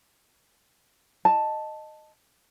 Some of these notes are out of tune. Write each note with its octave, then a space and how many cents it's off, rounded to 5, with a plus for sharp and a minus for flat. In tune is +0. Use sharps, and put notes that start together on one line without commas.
D#5 -10 A5 +0